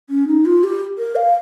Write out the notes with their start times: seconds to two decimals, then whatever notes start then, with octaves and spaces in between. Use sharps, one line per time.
0.10 C#4
0.28 D#4
0.46 F4
0.64 G4
0.98 A#4
1.16 F5